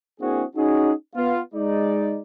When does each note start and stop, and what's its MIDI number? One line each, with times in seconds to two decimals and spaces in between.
0.21 0.44 58
0.21 0.44 60
0.21 0.44 62
0.21 0.44 64
0.21 0.44 66
0.21 0.44 68
0.56 0.92 61
0.56 0.92 63
0.56 0.92 66
0.56 0.92 68
1.15 1.40 59
1.15 1.40 65
1.55 2.20 56
1.55 2.20 63
1.55 2.20 74